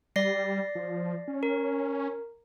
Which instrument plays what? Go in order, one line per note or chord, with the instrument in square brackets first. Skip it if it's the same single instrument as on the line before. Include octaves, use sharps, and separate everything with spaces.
[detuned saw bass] G3 [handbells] D5 A#6 C7
[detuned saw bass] F3
C#4
[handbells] A#4